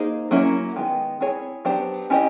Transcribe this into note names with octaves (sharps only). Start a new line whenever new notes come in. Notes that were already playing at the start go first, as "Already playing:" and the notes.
Already playing: A#3 D#4 G#4 C5
F#3 A#3 C#4 E4
D#3 G#3 B3
C4 E4 G#4 C#5
F#3 B3 D4 G4 C5
C#4 E4 G4 C5 D#5